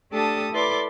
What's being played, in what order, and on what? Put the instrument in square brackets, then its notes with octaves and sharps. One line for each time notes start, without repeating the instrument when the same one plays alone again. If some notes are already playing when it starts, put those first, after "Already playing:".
[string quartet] A3 D4 G4 A4 A5 D#6
E4 A4 B4 D5 C6 D6